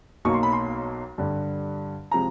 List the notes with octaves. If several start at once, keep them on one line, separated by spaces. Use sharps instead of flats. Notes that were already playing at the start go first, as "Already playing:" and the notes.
B1 B2 F#3 A#3 D#4 C#6
C6
B5
C6
G2 D3 G3
C3 F3 G#3 A#5